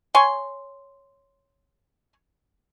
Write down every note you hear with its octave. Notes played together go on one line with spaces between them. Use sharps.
C#5 G#5 C6